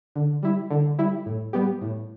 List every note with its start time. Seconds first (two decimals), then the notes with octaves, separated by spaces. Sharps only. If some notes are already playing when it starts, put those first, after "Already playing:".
0.16 D3
0.43 G3 E4
0.71 D3
0.99 G3 E4
1.26 A2
1.53 G3 B3 G4
1.82 A2